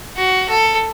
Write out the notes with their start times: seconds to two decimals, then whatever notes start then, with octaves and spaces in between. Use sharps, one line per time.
0.16 F#4
0.49 A4